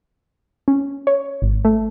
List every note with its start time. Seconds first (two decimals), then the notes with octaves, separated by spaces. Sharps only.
0.68 C#4
1.07 C#5
1.42 G#1
1.65 A3